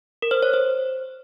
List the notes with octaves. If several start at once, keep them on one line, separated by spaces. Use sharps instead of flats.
A#4
C5
C#5
C5